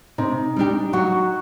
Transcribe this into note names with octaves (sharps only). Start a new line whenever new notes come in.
C3 D#4
G3 D4 G4
F#3 F#4